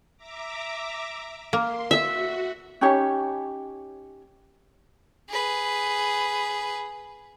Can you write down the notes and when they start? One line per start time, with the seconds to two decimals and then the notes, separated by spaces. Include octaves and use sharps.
0.17 E5 A#5 D6
1.53 A#3 C6
1.91 F#4 E5
2.81 C#4 D#4 G4 C#5
5.29 G#4 B4